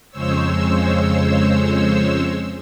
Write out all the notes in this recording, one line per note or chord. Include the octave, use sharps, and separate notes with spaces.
F2 C#3 G#3 C5 C#5 E6